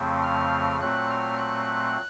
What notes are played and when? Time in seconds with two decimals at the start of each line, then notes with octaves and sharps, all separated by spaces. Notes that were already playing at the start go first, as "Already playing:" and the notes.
Already playing: F2 C#3 F3 A3 C4
0.23 F6
0.81 A#2 F#3 A3 C4 F#6
1.10 F6
1.38 F#6